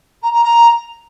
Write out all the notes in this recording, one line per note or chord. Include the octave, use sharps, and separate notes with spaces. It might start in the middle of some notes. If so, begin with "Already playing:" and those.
A#5
A#5
A#5